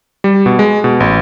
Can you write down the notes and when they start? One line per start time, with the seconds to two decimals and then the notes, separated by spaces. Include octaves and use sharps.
0.24 G3
0.46 B2
0.59 G#3
0.84 B2
1.00 A1